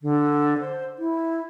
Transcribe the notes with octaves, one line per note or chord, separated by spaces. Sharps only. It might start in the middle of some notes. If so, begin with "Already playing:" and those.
D3
C5
E4